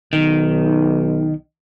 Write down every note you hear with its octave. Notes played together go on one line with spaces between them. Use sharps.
B1 D#3